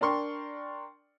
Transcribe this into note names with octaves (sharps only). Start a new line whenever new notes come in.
D4 A#4 D5 G5 C6 C#6